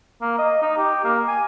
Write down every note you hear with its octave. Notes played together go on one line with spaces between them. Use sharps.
A#3
D#5
D#4
G4
A#3
G#5